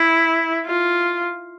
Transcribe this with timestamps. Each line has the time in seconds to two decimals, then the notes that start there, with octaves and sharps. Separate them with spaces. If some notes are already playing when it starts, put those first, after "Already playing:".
Already playing: E4
0.66 F4